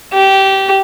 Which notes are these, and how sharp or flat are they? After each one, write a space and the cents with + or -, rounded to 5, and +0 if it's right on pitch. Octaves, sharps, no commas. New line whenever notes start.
G4 -15